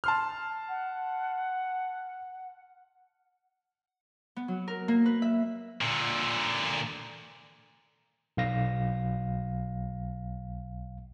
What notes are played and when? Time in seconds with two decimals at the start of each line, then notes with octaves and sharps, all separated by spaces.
0.04 A5 C6 F6
0.69 F#5
4.36 B3
4.48 F#3
4.68 A#4
4.88 A#3
5.06 B4
5.22 E5
5.81 A#2 D3
8.37 B1 F5 A#6